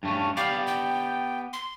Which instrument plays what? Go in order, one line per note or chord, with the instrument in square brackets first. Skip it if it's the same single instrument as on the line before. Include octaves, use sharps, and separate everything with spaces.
[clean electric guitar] G2 A3 C#4
[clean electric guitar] B3 G4 D5 [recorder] F5
[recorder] G5
C6